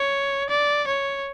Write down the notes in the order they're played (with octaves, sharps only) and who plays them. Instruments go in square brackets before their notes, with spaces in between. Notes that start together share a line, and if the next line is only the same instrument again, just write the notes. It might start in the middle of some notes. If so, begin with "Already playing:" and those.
Already playing: [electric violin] C#5
D5
C#5